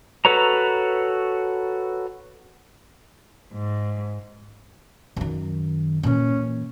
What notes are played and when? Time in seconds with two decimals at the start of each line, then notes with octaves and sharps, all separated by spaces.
0.25 F#4 A4 B4 C#5 A#5
3.53 G#2
5.17 F#2 D#3
6.03 A#2 E3 C#4